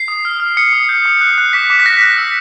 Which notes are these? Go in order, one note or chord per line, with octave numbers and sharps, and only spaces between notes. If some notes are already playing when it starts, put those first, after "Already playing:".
Already playing: C7
D#6
F6
F6
D#6 C#7
D#6
G6
D#6
F#6
F#6
D6 B6
D6
B6
F#6 A#6
F#6
E6